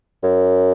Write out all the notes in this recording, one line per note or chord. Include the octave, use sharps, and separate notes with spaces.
F#2